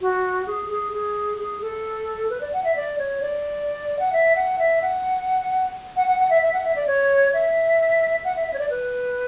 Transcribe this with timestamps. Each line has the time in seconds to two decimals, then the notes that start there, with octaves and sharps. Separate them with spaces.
0.01 F#4
0.47 G#4
0.70 G#4
0.93 G#4
1.38 G#4
1.62 A4
2.30 B4
2.41 D5
2.53 F#5
2.64 E5
2.76 D5
2.99 C#5
3.21 D5
3.99 F#5
4.13 E5
4.36 F#5
4.59 E5
4.82 F#5
5.96 F#5
6.07 F#5
6.19 F#5
6.30 E5
6.42 E5
6.53 F#5
6.64 E5
6.76 D5
6.87 C#5
7.34 E5
8.24 F#5
8.36 E5
8.48 E5
8.54 C#5
8.59 D5
8.70 B4